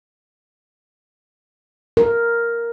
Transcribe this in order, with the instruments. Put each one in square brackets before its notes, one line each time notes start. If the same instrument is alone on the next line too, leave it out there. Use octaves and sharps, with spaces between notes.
[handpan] A#4